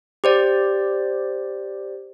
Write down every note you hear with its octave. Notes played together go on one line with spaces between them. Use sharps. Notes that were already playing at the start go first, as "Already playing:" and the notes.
G4 C5 D5